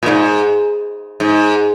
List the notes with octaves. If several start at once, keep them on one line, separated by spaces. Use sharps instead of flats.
A#2
G#2
G#2